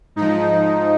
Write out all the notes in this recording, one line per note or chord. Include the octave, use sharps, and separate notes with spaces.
G#2 F3 D#4